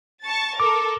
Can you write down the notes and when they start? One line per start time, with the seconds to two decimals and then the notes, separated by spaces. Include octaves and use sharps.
0.24 A5 C#6 A6
0.60 A4 A#4 D6